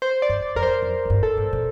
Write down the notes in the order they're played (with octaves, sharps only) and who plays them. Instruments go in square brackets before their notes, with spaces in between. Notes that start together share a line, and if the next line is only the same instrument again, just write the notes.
[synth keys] C5
D5
[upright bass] G2
[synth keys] D5
[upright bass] F2 [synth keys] A#4
[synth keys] C5
[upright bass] F2
F2
G2
[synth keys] A4
[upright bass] A2
A#2